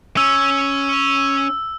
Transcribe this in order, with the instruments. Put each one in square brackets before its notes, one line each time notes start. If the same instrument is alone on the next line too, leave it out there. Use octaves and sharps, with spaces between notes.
[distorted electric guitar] C#4 [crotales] E6